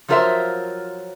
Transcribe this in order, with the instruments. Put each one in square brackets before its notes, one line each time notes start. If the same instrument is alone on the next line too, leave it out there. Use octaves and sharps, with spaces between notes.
[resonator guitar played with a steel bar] F3 F#3 F4 A#4 C5 E5